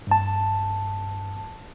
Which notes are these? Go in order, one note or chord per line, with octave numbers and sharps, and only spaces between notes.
G2 A5